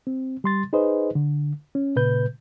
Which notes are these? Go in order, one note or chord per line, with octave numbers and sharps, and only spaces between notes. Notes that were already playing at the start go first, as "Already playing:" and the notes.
C4
G3 C6 A6
D#4 G#4 B4 C5 D#5
D3
C#4
A#2 C#3 B4 G6